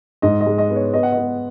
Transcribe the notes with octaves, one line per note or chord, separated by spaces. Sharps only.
G#2 D#5
D#5
G#3
D#5
B3
C#5
B3 D#5
F#5
B3 D#5